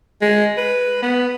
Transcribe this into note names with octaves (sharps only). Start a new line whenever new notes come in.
G#3
B4
B3